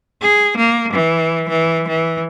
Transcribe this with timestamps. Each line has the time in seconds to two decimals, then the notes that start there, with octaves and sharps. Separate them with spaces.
0.21 G#4
0.57 A#3
0.92 E3
1.49 E3
1.87 E3